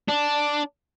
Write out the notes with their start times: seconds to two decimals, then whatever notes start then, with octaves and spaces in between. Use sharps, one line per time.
0.09 D4